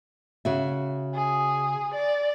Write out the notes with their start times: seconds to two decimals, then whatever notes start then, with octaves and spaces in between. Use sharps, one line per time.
0.45 C#3 F#4 E5
1.15 G#4
1.94 D5